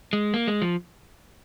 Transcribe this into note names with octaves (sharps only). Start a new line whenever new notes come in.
G#3
A#3
G#3
F3